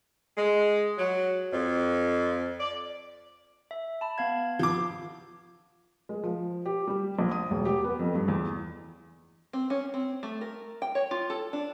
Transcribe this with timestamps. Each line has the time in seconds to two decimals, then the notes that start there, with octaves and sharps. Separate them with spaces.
0.37 G#3
0.98 F#3
1.53 F2
2.60 D5
3.71 E5
4.01 A5 B5
4.18 B3 F5 G#6
4.59 F3 D6
6.09 G#3
6.23 F3
6.66 G4
6.87 G3
7.19 A#1
7.31 D#6
7.51 E1
7.65 G4
7.84 B3
7.99 F2
8.15 G2
8.28 E2
9.53 C4
9.70 C#4
9.94 C4
10.23 A3
10.41 A#4
10.82 G5
10.95 C#5
11.11 F4
11.30 A4
11.53 D4